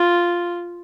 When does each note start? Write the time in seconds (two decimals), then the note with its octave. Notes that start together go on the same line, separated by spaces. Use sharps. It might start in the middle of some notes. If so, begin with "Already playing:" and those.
Already playing: F4